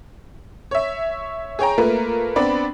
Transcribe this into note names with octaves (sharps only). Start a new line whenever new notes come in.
C#5 E5
G#4 C#5 G5 A#5
A3 A#3 F4 A#4 B4
B3 C4 D4 D5 B5